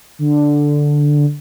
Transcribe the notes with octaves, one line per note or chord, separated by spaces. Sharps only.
D3